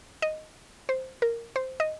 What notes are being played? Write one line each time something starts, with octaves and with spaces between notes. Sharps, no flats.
D#5
C5
A#4
C5
D#5